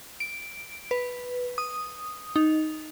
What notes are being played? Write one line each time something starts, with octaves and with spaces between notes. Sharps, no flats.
D7
B4
D#6
D#4